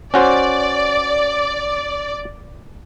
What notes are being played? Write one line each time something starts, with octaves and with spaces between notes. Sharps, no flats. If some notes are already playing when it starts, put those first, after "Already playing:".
C#4 F#4 C5 D5